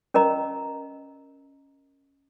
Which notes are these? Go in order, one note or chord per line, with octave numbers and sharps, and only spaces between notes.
C#4 A#4 D#5 A#5